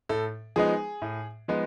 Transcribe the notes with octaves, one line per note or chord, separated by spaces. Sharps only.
A2 A4
F3 G#3 B3 D#4 G#4
A2
F3 G#3 B3 D#4